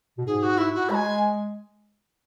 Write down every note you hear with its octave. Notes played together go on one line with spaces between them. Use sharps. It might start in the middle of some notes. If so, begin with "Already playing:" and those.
B2
G#2 G#4
F#4
E4
F#4
G#3 G#5 B5